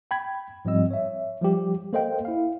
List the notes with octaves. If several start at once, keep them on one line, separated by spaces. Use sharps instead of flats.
G5 B5 G#6
G#2 F3 G3 C4 D#5 E6
C#5 E5
F3 G3 G4
A#3 A4 C5 D#5 F5 G5
E4 F5